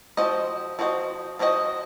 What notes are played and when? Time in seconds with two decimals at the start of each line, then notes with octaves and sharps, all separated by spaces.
0.17 F3 C4 F#4 C5 D#5
0.79 F3 C4 F#4 C5 D#5
1.39 F3 C4 F#4 C5 D#5